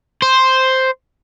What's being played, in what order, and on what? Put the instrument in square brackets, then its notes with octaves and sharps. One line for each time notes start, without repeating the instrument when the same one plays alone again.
[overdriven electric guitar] C5